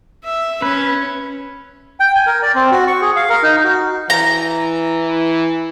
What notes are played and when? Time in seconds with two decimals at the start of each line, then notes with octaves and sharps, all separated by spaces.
0.24 E5
0.62 C#4 B4
2.00 G5
2.15 G#5
2.27 A#4
2.43 D5
2.55 C4
2.72 F#4
2.87 C#6
3.02 G#4
3.16 F5
3.29 A#4
3.43 D#4
3.64 F#4
4.10 E3 A#5